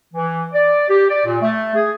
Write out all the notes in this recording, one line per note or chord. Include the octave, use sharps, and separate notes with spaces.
E3
D5
G4
D5
A#2
A3
G#4